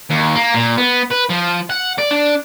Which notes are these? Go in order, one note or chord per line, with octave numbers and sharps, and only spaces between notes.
D#2
A#3
A#2
B3
B4
F3
F#5
D5
D4